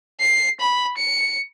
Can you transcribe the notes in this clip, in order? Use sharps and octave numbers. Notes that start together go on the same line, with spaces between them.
C7
B5
C#7